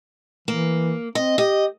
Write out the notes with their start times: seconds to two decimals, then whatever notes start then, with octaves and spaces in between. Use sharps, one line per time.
0.48 E3 A#3
1.15 C4 D#5
1.38 G4 D#5